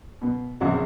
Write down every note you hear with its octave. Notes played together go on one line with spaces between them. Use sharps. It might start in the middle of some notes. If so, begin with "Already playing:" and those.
B2 B3
A#1 E2 C#3 F#3 C4 F#5